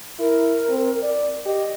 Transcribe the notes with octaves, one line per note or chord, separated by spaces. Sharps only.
E4 A#4
C4
D5
G4 D#5